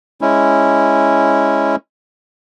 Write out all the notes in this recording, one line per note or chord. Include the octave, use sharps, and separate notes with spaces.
G#3 C#4 E4